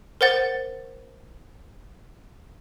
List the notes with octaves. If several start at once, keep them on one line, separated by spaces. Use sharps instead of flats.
A#4 C5 F#5 A6